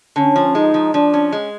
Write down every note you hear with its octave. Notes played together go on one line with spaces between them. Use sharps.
D3 C#4
F3
G#3 D#4
F3
F3 D4
C#4
G#3